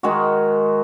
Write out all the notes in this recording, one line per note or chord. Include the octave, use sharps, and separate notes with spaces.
D#3 G#3 F#4